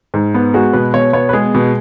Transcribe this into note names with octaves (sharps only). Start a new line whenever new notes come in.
G#2
B3
G#3 F#4
B2 B4
B2 C#5
B3 C#5
B4
G#3 G#4
B2